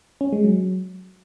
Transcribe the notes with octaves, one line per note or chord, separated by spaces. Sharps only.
C#4
G#3
F#3